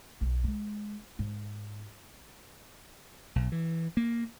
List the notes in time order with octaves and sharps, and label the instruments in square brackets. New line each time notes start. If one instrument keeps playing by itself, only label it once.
[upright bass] B1
G#3
G#2
[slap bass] B1
E3
A#3